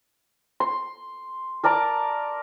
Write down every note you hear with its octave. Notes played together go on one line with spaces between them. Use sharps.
C6
A#4 D5 A5 A#5